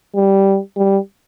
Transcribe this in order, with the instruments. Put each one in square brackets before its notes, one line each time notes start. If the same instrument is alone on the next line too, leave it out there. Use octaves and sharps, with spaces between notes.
[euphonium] G3
G3